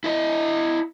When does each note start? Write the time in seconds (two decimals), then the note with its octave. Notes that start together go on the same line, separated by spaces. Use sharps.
0.04 E4 D#5